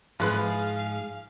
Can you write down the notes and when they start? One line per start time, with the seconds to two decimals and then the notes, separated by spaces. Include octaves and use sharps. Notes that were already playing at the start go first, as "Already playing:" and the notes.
0.20 G#2 F3 E4 F4 G#4 B4 F5 F#6